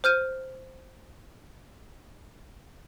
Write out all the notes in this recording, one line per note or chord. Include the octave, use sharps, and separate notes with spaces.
C5 F6 G6 D#7